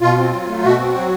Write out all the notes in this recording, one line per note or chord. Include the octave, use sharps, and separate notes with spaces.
B2 F4
C4
F#3
A3
B2 F#4
C4
F#3